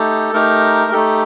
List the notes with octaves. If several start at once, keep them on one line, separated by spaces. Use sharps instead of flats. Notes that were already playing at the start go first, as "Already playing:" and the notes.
Already playing: A3 D#4 G4 A4
A3 D#4 G4 A#4
A3 D#4 G4 A4